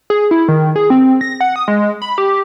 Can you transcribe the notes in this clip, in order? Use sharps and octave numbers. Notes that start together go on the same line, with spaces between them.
G#4
E4
D#3
G#4
C4
A#6
F#5
D#6
G#3
B5
G4